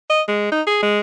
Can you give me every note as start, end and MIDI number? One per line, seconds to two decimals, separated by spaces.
0.10 0.22 75
0.28 0.49 56
0.52 0.62 63
0.67 0.82 68
0.83 1.00 56